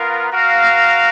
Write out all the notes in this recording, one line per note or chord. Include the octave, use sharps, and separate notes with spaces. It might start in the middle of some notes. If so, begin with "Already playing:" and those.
Already playing: B3 F4 A#4 F5
F#4 A#4 F5